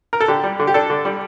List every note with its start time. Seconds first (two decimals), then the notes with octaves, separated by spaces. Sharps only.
0.13 A#4
0.21 A4
0.28 D3 G4
0.44 G3
0.60 D3
0.67 G4
0.74 D4 A4
0.90 D3
1.05 G3